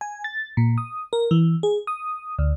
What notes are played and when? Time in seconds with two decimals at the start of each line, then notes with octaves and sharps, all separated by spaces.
0.01 G#5
0.24 A6
0.57 A#2
0.78 D#6
1.13 A#4
1.31 E3
1.63 G#4
1.87 D#6
2.39 D2